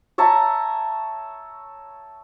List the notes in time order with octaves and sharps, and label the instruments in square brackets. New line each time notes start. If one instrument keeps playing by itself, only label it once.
[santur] C#5 E5 A5 A#5